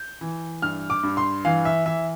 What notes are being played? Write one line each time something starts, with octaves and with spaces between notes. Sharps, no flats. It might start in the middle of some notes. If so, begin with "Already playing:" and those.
Already playing: G6
E3
G2 F6
D6
G2
C6
E3 F5
E5
E3 E5